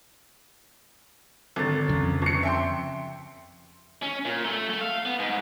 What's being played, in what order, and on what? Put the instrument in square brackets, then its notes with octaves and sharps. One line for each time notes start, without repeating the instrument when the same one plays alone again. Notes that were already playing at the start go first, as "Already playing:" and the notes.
[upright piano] G#1 D3 A6
[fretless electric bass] F2 C#3
[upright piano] G1 C#7
E5 G5 C6
[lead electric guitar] C#4
A#2
A3
A3
F5
B3
G#2